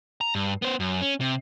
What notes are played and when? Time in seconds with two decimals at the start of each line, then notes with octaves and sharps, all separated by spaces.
0.21 A#5
0.35 G2
0.62 B3 C5
0.80 F#2
1.02 C#4
1.21 C3